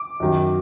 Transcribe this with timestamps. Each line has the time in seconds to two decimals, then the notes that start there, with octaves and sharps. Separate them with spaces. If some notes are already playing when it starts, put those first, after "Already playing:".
Already playing: D6
0.20 F#2 D#3 F#3